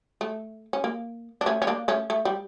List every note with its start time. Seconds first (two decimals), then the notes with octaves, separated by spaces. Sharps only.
0.21 A3
0.73 C#4
0.84 A#3
1.41 D4
1.46 A3 C#4
1.62 C#4
1.67 A#3 D4
1.88 A3 C#4
2.10 A3
2.25 G3